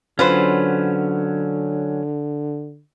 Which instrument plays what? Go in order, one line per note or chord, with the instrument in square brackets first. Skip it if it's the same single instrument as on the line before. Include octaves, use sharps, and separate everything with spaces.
[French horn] D3 [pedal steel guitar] F#3 C#4 [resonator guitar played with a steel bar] F4 B4 C5